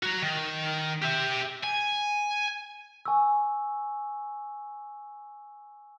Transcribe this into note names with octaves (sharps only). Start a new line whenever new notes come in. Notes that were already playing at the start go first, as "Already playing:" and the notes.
F#4 A#5
D#3
G4 E5
G#5
G#5 C#6 E6